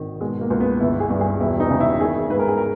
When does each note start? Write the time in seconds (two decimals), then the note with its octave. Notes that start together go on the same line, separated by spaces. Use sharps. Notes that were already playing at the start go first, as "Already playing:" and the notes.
Already playing: G#1 D#3
0.20 B2 G#3
0.41 A#3
0.50 C#2
0.60 B3
0.81 G1 E4
1.00 G#4
1.10 G2
1.21 G#4
1.40 E1 E4
1.60 D#4
1.70 C#3
1.80 E4
2.00 D#3 G#4
2.30 G#2 B4
2.39 A#4
2.48 G#4
2.58 A#4